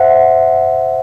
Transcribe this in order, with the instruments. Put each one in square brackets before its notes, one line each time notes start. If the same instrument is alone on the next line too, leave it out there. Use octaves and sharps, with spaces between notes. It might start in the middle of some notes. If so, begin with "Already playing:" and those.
Already playing: [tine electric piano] C5 E5 F#5